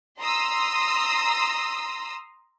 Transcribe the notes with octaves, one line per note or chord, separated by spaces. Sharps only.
A#5 C6 D#6 E6